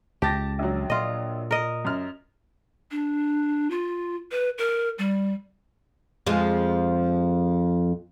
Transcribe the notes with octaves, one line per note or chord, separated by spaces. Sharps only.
C#2 G4 A5 A6 A#6
A#1 F#3
A#2 F4 D#5
A#4 D#5
F#2 F6
D4
F4
B4
A#4
G3
F2 F3 G#3